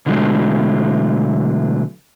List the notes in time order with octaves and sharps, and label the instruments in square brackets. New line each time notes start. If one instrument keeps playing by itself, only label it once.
[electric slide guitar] B2 D3 E3 F#3 G#3 A3